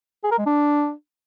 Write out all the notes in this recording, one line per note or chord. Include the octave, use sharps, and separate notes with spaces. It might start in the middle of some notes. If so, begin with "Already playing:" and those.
G#4
A#4
G#3
D4